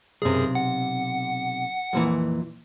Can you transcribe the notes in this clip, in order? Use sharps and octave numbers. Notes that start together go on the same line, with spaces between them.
B1 F#2 C3 G#4
F#5
F2 A#2 E3